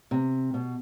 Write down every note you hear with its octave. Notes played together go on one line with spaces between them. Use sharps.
C3
B2